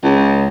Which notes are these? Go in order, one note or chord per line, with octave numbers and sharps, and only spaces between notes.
C#2